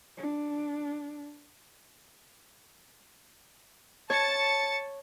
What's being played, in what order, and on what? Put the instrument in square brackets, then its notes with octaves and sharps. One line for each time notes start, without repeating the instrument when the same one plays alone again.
[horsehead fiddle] D4
[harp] C#5 [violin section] A5 A6 C#7